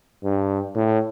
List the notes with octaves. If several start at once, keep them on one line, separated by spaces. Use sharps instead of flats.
G2
A2